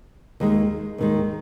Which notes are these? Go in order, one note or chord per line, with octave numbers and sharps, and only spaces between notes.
D#2 D#3 G#3
D#2 D#3 G#3